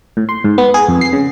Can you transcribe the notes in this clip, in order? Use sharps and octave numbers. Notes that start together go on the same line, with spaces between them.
A2
C6
G#2
B3
G#4
F2
C7
C#3